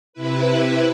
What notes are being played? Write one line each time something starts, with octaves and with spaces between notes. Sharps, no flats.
C3 E4 B4